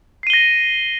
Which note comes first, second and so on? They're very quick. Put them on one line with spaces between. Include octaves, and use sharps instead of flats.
C7 D#7 G7 A#6